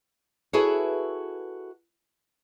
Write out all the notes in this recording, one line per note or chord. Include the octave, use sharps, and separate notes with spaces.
E4 F#4 G#4 A4 B4 C#5